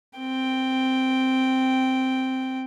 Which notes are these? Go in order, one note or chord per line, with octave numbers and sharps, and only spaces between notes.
C4 G5